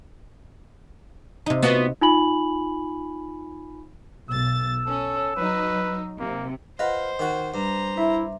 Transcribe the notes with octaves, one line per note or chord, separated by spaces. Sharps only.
C3 D#4
B3 F4 F#4
D#4 F4 G#5 B5 F#7
B1 E6 A6
C#4 A4
F#3 D#4 B4
C3 A#3
F4 B4 C5 D#5 F#5
D#3 F#4
G2 C5 A#5
E4 E5